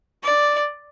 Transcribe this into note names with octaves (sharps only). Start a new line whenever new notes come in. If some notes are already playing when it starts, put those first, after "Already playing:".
D5